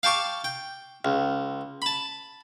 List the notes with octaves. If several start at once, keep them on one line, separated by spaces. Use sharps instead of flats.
F5 G5 A5 C#6 D6
G5
C#2
A5 B5